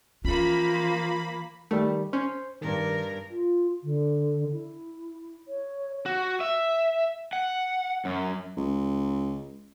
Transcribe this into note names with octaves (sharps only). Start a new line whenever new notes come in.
E3 F3 A#3 C#4 F4 B5
D#3 G3 A3
C#4 C5
G2 D#3 A#4
F4
D3
E4
C#5
F#4
E5
F#5
F#2
C#2